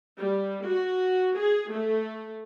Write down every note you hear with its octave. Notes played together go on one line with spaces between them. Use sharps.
G3
F#4
G#4
A3